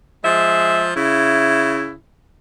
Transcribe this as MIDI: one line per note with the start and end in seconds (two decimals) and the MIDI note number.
0.24 0.91 53
0.24 0.91 56
0.24 0.91 76
0.95 1.93 49
0.95 1.93 64